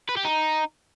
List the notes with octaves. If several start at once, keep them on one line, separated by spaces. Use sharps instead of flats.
B4
G4
D#4